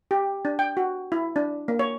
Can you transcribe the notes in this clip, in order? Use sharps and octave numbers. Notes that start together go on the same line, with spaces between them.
G4
D4
G5
F#4
E4
D4
A#3
C#5